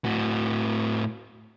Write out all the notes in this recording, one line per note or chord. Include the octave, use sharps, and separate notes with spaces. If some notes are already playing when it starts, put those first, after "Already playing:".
A2 F#4